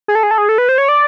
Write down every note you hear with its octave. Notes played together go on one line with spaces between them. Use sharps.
G#4
A4
G#4
A4
G#4
A4
B4
C5
C#5
D5